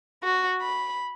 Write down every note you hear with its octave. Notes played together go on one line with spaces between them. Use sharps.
F#4
B5